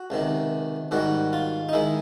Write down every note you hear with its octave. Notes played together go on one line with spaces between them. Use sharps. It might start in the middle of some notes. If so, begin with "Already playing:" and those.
Already playing: F#4
C#2 C3 D#3
G#2 D#3 G3 F#4
F4
D#4
D#3 G#3 E4